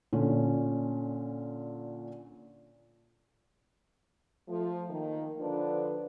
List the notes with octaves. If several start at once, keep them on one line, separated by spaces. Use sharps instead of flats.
A#2 D3 C#4
F3 A3
D#3 A#3
D3 F3 D4 A4 B4 C5